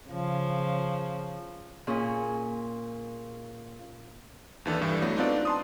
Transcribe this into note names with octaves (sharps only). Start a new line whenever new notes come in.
C#3 F3
A#2 C#4 G#4
D#2 E3 D4 A4
G2 E3 G3
F#3 A3 B3 F#4
C4 D4 D#4 F4 B4 D5
A5 C6 D#6